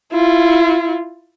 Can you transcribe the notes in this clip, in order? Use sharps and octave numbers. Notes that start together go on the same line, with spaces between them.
E4 F4